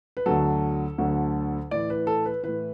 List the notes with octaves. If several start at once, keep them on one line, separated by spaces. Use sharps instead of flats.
B4
D2 D3 F#3 A4
D2 D3 F#3
A2 E3 D5
B4
A4
B4
A2 E3 B4